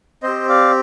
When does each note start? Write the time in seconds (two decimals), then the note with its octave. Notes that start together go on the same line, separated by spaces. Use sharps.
0.23 C4 G4 C5 D#5
0.49 D5 F5